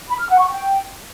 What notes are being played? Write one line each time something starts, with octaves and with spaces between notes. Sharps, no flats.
B5
F6
F#5
C#6
G5